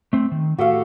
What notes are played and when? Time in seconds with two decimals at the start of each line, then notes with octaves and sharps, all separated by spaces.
0.13 A3 C4
0.32 D#3
0.58 A2 F#4 G4 A4 F5